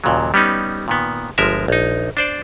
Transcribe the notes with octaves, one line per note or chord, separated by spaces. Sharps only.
D#2 A#2 C#3 F#3
G3 B3 C#4 D#4
A#2 D#3 B3
G1 F3 G#3 A#4 E5
A#1 D#4
D4 C5 D5